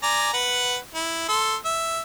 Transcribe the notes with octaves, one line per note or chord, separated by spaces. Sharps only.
D5 G#5 A#5
B4 F#5
E4
A4 C6
E5